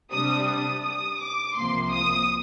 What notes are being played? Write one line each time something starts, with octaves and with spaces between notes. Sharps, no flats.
C3 G3 D4 D#6
D#6
D#6
D6
C2 C3 F3 A#3 C6
D#6